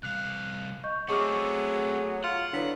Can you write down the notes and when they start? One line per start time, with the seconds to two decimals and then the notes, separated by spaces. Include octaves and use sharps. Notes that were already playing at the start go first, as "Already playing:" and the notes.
0.03 C2 F5 F#6
0.84 D#5 C#6 G6
1.08 F#3 A3 B3 C4 G#4 C#6 D6 F6
2.24 F4 F#5
2.53 D3 F#3 B3 D4 E4 B6